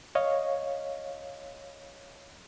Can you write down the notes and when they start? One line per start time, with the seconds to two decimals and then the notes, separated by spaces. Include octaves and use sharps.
0.15 C#5 D#5 F5